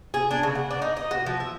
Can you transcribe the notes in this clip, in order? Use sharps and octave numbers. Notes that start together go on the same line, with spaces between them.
G#4
D4
C#3
F#5
D4
D#4
D#5
F#4
F3
E5